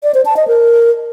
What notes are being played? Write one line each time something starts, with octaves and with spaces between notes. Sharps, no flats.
D5
C5
A5
D#5
A#4